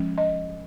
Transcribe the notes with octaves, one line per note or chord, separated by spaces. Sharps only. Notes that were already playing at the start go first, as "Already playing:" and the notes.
Already playing: F3 G#3 C#4
D#5